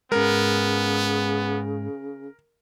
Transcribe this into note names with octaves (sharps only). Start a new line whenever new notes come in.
G#2 C#3 G#3 B3 A#4